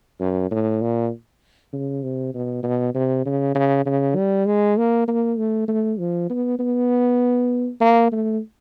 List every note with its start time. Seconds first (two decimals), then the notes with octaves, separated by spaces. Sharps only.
0.20 F#2
0.51 A2
0.82 A#2
1.73 C#3
2.03 C3
2.34 B2
2.64 B2
2.94 C3
3.25 C#3
3.55 C#3
3.86 C#3
4.16 G3
4.47 G#3
4.77 A#3
5.08 A#3
5.38 A3
5.68 A3
5.99 F3
6.30 B3
6.59 B3
7.81 A#3
8.12 A3